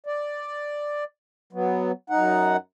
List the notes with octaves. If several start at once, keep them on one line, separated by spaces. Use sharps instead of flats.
D5
F#3 B3
F#2 D#4 F#5